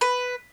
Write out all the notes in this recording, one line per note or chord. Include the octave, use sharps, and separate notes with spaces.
B4